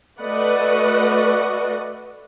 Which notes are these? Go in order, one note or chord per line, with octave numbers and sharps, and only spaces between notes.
A3 F#4 B4 D5 D#5 F#5